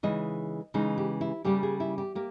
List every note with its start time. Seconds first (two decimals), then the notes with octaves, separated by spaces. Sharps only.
0.03 C#3 E3 G#3 D#4 D#5
0.74 C#3 E3 G#3 D#4
0.98 G4
1.21 E4
1.44 C#3 G3 A#3 G4
1.63 G#4
1.80 E4
1.98 G4
2.15 A#3 G4